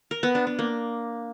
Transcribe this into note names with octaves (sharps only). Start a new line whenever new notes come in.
A#4
B3
D4
B3
A#3